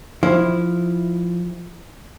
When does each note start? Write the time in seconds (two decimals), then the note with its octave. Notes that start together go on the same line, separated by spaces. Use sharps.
0.23 F3 E4